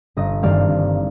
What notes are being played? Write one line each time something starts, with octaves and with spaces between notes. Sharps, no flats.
G1 D#5
G2 D#3 G3 C4 D5 F5
G1